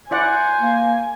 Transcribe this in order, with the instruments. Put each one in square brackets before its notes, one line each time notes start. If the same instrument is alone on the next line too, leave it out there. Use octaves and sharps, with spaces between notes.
[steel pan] E4 D5 F#5 [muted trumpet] C5 [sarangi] G#5
[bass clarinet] A#3